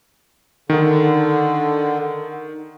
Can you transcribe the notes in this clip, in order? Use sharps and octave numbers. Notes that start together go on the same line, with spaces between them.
D3 D#3